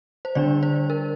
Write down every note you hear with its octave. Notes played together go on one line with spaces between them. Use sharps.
C5
D3 G3 D4 D5
C5
A#4